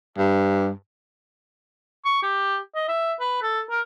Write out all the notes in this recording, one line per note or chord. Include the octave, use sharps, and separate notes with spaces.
G2
C#6
G4
D#5
E5
B4
A4
A#4